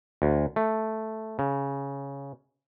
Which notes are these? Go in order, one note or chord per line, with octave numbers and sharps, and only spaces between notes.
D2
A3
C#3